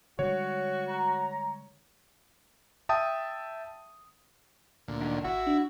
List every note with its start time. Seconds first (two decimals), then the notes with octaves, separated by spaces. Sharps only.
0.19 D3 G3 G#3 F#4 C#5
0.87 A#5
2.89 E5 G5 A5 D#6
4.88 D2 A#2
5.01 D3 D#3 D4
5.24 G#1 E4 F#4
5.47 D4